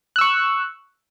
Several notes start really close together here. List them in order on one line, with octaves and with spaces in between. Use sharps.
F#6 E6 C#6